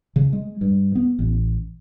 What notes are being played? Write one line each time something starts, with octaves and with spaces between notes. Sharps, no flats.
C#3
G#3
G2
B3
A1